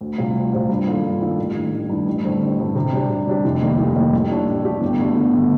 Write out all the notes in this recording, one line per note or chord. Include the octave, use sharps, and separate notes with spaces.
D2
C3 G3 C4 F4
D2
C3 G3 C4 F4
G2
D#3 A#3 F4 A4
G2
D#3 A#3 F4 A4
A1
G2 D#3
A1
G2 D#3
A1
G2 D3 A3 C4
A1
G2 D3 A3 C4
C3
G3 D4 G4
C3
G3 D4 G4
F1
D#2 D#3 G3 A#3
F1
D#2 D#3 G3 A#3
A1
A2 A3 D4 G4
A1
A2 A3 D4 G4
G1
G2 D3 A3
G1
D3 A3